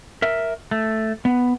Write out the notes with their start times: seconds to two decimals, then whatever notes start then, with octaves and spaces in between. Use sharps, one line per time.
0.22 A#4 E5
0.71 A3
1.25 B3